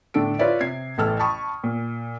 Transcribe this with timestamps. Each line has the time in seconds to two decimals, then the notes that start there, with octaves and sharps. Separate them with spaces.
0.14 A2 D3 D4 A4 D7
0.39 F4 B4 C#5 D5 E5
0.60 C3 G#6 C7
0.98 A1 E3 A4 A5 F6
1.19 G5 A5 B5 C#6 D#6
1.64 A#2